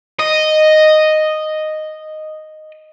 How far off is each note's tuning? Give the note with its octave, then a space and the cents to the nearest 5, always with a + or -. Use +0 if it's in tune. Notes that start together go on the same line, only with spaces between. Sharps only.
D#5 -5